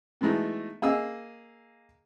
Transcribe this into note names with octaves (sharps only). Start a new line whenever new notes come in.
B2 E3 G#3 A3 D#4
A#3 G#4 D#5 E6